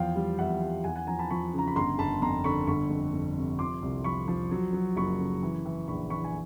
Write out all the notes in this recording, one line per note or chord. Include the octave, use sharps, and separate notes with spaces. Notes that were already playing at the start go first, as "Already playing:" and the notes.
Already playing: E2 F3 F5 G5
G3
E2 E5 F#5
G3
E2 F#5 G#5
F#5 G#5
F3 G#5 A#5
A5 B5
F3 B5 C#6
C#3 A#5
B5
G1 A#5 C6
G1 A5 B5
F2 A#5 C6
D3 B5 C#6
G1 B5 C#6
F2
F2
C3
F3 C6 D6
C2
F3 B5 C#6
F3
F#3
F#3
F#1 B5 C#6
C#3
E3
E3
A#1 B5 C#6
E3 B5 C#6
G#5